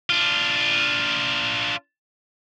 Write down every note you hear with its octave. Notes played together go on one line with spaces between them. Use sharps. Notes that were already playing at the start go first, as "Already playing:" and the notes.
D4 F4